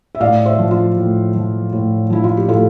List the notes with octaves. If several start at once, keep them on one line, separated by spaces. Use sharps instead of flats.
E5
A2 D5 F5
C5 E5
F3
F4
A2
F3
A2
F3 E4
F4
G4
A2 F4 A4